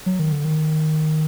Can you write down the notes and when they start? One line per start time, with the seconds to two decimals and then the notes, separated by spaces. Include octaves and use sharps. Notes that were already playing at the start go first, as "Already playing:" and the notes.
0.06 F#3
0.19 D#3
0.32 D3
0.45 D#3